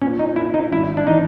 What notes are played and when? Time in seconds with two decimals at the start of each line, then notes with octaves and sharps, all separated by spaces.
0.02 A#2 C#4
0.19 D#4
0.36 A#3 E4
0.54 D#4
0.72 G#1 E4
0.97 D4
1.07 E3 D#4